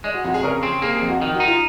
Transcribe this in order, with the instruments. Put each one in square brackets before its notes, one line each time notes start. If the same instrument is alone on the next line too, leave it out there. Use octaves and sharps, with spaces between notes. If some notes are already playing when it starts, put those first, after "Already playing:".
[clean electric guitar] G#3 [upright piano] D#5
[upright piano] F#4
[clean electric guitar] F2 [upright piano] F#4
[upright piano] G#4
[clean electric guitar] C#3 [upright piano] A#4
[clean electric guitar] C4 [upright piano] G#4
[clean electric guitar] A#3 [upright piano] G#4
[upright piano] G#4
[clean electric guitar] F2
[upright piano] F#4
[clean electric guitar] D#3
[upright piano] F#4
[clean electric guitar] D#4
[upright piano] F4